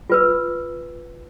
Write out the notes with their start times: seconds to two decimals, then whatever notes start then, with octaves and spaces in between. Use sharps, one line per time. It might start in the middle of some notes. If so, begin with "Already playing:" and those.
0.10 F4 B4 E6